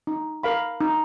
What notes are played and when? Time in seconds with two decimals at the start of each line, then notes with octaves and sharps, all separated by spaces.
0.07 D#4
0.43 A#4 F5 B5
0.81 D#4